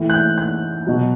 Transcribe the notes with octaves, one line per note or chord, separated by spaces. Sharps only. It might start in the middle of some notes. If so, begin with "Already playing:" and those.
Already playing: A2 E3
F#6
G6
F#6
B2 F#3